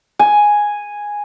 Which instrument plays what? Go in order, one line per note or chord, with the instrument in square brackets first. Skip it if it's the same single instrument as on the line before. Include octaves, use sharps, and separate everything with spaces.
[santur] G#5